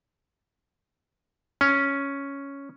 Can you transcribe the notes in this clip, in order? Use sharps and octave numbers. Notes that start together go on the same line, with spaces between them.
C#4